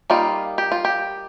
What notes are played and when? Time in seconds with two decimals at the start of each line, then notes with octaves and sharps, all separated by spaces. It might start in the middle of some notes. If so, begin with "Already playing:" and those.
0.10 G3 A#3 D#4 F4
0.58 G4
0.72 F4
0.85 G4